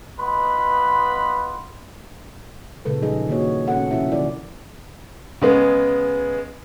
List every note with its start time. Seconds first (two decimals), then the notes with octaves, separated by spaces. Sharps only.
0.19 B3 F4 B4 D#5 B5 C6
2.85 A#2 C#3 G#3 A4 B4
3.02 F3 G3 D#4 G#4 D#5
3.28 D#3 A#3 D4 F#4 C#5
3.68 A#2 B3 C#4 F#4 A4 F#5
3.91 C3 F3 C#4 E4 E5
4.12 D3 F#3 A#3 E4 A#4 D5
5.41 C#3 G#3 B3